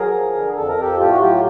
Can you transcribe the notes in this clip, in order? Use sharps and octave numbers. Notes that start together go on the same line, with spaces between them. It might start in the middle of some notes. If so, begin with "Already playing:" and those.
Already playing: F#3 G#4 A#4
F3
D3
F2 A4
A#4
F2 G4 A4
A2 F4 G4
F#4
F#3 F4 G4